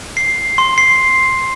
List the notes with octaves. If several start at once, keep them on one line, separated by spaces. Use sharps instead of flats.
C7
C6
C7